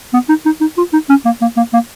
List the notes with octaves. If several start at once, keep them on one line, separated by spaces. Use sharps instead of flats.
B3
D#4
D#4
D#4
F4
D#4
C#4
A#3
A#3
A#3
A#3